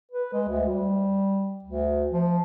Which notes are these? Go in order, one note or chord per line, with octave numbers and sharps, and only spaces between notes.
B4
G#3
D2
G3
D2
F3